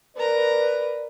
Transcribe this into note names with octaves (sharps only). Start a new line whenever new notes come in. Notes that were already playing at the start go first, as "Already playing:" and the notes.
A#4 B4 D5 A#5